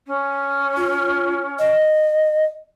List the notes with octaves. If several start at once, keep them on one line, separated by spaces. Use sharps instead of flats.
C#4
F4
D#5